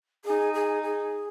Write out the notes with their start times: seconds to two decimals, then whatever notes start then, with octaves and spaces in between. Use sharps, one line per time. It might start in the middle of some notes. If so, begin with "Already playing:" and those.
0.25 D#4 G#4
0.54 G#4
0.83 G#4